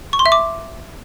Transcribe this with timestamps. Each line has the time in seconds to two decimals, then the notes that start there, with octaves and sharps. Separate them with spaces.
0.13 C#6
0.19 C6
0.26 E5
0.32 D6